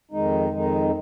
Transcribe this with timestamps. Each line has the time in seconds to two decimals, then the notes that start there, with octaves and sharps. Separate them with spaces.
0.11 F2 D#3 G#3 D#4
0.52 F2 D#3 G#3 D#4